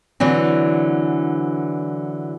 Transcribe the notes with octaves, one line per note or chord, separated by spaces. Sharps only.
D3 E3 F#3 C4